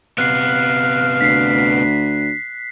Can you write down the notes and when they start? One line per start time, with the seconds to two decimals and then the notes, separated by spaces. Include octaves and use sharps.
0.18 C3 B3 F5 F#6 C7
1.21 D2 B6 C7